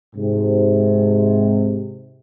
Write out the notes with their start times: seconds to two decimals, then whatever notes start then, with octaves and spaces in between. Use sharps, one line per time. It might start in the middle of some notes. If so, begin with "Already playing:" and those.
0.16 G#2 C3